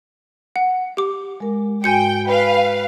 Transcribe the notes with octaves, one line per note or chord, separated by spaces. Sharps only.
F#5
G4 D6
G#3 A#4
G#2 F#4 G5 G#5 G6 C#7
B4 F5